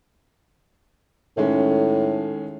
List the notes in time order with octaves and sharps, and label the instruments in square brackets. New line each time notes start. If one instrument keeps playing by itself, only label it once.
[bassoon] A2 [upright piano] D#3 G#3 C#4